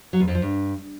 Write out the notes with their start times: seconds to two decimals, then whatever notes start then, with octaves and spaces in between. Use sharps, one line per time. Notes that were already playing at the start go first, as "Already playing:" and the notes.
0.13 F#3
0.20 E2
0.28 F2
0.35 F3
0.42 G2